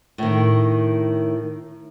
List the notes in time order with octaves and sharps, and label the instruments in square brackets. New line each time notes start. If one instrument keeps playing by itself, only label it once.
[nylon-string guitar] A2 D#3